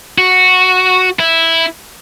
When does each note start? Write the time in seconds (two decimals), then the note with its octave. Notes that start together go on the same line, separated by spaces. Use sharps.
0.18 F#4
1.19 E4